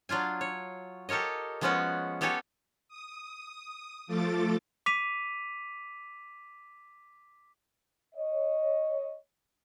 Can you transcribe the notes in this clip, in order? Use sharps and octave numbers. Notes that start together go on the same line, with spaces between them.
F#3 D4 F4 G#5
C#5
G4 A4 A#4 C#5 D#5
F3 G#3 B3 C#4 F#4 B4
B3 G4 A4 C#5 G#5
D#6
F3 A3 F4 A4 D6 A6
D6 B6 D#7 F7
C#5 D#5